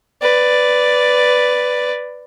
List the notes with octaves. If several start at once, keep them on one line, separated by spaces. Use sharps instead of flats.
B4 D5